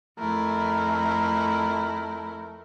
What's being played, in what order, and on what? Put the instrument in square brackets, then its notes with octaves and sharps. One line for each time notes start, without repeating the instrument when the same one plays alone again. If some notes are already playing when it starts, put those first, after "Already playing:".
[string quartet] F2 E4 [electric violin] A3 A#4